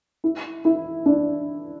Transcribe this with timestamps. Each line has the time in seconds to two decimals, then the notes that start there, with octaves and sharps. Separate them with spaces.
0.24 E4
0.65 E4
1.06 D4